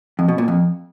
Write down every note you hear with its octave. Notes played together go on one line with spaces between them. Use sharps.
F2
B2
A#2
F2